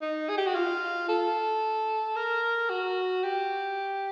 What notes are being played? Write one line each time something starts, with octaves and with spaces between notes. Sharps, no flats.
D#4
G#4
G4
F#4
F4
A4
A#4
F#4
G4